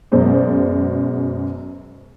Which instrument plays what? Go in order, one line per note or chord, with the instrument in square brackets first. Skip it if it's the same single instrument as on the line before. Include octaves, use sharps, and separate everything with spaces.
[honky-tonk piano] F#2 B2 G#3 C5 D5